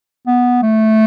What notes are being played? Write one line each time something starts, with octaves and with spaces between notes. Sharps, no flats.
B3
A3